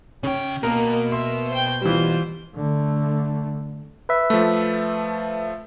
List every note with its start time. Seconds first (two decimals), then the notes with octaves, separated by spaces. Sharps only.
0.23 C#3 C#4 G5
0.63 B2 A#3 A#4
1.12 A#4 E5 C6
1.49 C5 G5
1.81 E3 G3 F4 C5
2.55 D3 A3
4.09 B4 E5
4.30 F3 A3